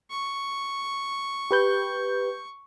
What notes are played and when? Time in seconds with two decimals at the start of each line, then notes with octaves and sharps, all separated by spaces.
0.10 C#6
1.51 G4 B4 G6